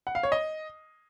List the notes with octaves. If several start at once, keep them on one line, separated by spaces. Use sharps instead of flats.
F#5
F5
C#5
D#5